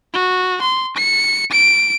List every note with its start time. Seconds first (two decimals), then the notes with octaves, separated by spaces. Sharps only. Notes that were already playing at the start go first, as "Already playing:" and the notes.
0.14 F#4
0.62 C6
0.96 C#7
1.51 D7